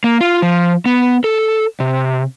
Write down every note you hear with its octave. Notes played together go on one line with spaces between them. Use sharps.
A#3
F4
F3
B3
A4
C3